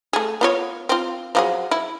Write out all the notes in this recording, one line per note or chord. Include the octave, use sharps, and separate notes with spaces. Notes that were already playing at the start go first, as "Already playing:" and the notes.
A3 G#4
B3 F4 C#5
C4 F4
F3 F#3 G#4
E4